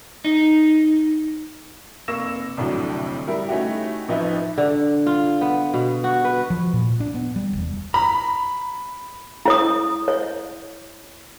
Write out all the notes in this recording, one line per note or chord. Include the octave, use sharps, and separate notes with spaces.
D#4
F1 A#3 C#6 E6 A#6 E7
C2 F2 A2 D3 F#3
G3 E4 A#4
A3 C#4 D#4 E4 F#4 G4
A1 F3 D#4 B4 E5
D3
F4
B3
B2
F#4
B4
F3
A#2
D4
B3
G3
E1
A#5 B5
E4 C#5 D#6
C#5